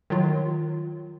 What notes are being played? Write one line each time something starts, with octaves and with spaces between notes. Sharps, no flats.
D#3 F#3 F4